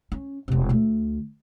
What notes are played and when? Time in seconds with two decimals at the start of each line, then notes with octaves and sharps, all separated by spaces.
0.12 C#4
0.48 E1 C3
0.69 D2 A3